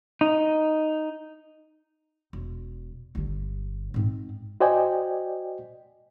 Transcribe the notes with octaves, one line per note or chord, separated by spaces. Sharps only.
D#4
E1
G1 D3
G#2 C4
F#4 C5 D5 D#5 G5 G#5